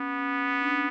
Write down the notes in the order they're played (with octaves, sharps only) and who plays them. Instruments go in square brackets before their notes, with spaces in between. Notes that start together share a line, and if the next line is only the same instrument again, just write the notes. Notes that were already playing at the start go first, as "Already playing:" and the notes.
Already playing: [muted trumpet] B3 [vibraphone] C#4
[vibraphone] C#4
D4